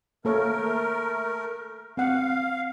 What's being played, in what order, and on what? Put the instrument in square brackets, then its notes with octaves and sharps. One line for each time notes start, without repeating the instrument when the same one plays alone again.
[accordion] A3 A#4 [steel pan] A#3 A4 C#5
[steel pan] C4 F#5 [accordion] F5